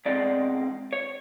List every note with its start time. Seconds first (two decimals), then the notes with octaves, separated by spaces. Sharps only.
0.06 E2 B2 G#3 C4 D5
0.93 C#5